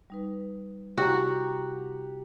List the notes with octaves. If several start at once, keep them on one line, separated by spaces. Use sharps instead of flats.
G3 D#4 B4
C3 E4 F#4 G4 F#5 A#5